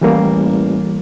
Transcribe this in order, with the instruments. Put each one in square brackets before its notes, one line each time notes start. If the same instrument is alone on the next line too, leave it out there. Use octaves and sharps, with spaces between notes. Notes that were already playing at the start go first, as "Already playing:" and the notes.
[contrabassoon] A1 [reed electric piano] E3 G3 A#3